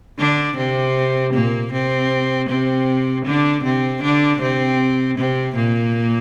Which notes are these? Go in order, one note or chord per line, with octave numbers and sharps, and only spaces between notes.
D3 D4
C3 C4
A#2 A#3
C3 C4
C3 C4
D3 D4
C3 C4
D3 D4
C3 C4
C3 C4
A#2 A#3